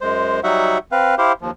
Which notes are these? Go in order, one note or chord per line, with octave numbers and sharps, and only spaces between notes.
F#2 G#3 C5
F#3 G3 D#4 F#4 E5 F#5
C4 B4 F5
E4 G4 C5 F5
D#2 F3